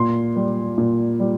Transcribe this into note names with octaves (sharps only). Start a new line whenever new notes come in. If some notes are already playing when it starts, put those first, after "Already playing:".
Already playing: A#2 C6
G3
A#2
G3